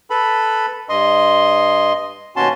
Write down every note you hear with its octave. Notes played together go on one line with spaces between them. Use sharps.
A4 B4 B5
G2 D#5 C6
D#2 B2 C#4 F#4 A5 C6